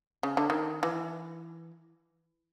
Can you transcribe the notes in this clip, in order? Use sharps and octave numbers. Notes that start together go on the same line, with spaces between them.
C#3
D3
D#3
E3